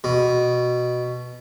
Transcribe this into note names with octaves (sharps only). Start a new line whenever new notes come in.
B2